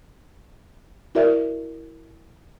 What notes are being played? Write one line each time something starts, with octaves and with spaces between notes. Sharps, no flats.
E4 F#4 A#4 D5 E5